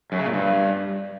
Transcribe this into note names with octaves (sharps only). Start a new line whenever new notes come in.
F#2
C#3
A#2
G2